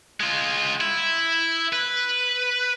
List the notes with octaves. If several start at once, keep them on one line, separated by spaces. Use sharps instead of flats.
G#3 F4
E4
B4